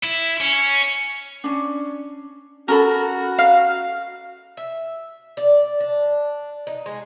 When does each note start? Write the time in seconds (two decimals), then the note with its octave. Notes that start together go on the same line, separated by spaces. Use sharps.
0.03 E4
0.41 C#4
1.44 C#4 D4
2.68 C#4 F#4 A4 A#4 B5
3.39 F5
4.57 E5
5.37 D5
5.80 D4
6.67 D#4
6.86 G#3